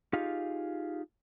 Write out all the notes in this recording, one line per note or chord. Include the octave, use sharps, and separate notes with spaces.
D#4 F4 G4 G#4 F5